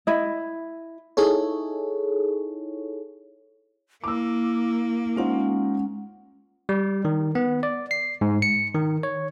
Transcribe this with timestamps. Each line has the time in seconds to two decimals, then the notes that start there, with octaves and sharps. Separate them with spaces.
0.07 E4 D#5
1.17 D#4 E4 G#4 A4 C#5
4.04 A#3 E4 D6 E6
5.16 G#3 C#4 D#4 F4 C5 F#5
6.69 G3
7.05 D#3
7.35 B3
7.63 D5
7.91 C7
8.21 G#2
8.42 C#7
8.74 D#3
9.03 C#5